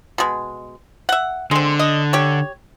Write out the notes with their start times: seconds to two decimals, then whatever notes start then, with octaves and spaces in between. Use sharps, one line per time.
0.18 B2 G#3
1.09 E5 F#5
1.51 D3 G#3 C4
1.79 D#5
2.13 G4 C#5